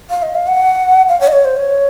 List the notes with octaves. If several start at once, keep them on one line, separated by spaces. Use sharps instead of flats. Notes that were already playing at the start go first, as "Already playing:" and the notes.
F5
D#5
F5
F#5
F5
C#5
D#5
C#5
C5
C#5